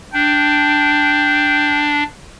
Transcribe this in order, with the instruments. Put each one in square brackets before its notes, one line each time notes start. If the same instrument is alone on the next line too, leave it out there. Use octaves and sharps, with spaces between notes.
[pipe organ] D4 [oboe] G5